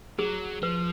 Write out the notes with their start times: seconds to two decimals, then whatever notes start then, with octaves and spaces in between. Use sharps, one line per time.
0.19 F#3 G#4
0.62 F3 B4